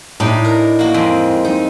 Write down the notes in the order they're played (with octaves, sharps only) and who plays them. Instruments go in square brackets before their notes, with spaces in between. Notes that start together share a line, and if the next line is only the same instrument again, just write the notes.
[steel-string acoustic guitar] A2 [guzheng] D4 D#4 G4
[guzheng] A#4
A#3 F#4
F2 G#3 C4
[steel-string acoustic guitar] D#4